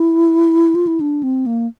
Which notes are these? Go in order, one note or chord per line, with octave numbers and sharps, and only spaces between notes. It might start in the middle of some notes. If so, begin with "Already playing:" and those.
Already playing: E4
F4
E4
D4
C4
A#3